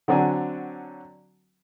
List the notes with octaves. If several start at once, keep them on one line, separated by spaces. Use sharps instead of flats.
D3 F#3 C4 D4 F#4 G#5